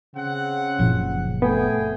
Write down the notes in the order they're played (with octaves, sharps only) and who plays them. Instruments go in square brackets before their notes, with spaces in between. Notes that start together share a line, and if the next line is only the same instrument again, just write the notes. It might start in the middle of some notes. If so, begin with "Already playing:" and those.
[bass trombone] C#3 [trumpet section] C4 F#5
[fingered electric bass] F#1 A#2 F3
[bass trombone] A3 [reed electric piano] B3 [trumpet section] G#4 G5 G#5